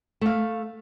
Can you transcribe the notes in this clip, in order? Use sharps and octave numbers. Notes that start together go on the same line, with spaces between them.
A3 F5